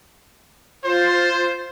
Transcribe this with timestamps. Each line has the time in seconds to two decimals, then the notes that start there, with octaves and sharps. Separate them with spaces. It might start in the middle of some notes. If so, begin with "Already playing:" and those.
0.84 F4 C5